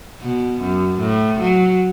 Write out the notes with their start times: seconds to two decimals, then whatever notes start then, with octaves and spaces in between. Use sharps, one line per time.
0.21 B2
0.61 F#2
1.00 A2
1.40 F#3